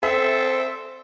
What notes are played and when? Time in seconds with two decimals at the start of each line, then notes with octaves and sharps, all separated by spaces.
0.03 C4 A4 E5